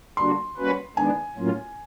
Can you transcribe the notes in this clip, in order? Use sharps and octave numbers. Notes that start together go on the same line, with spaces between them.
D3 G3 A#3 D4 F#4 C6
G3 A#3 C#4 F#4 B4
D#3 G#3 B3 D4 G#5
A2 F#3 A#3 C#4 F4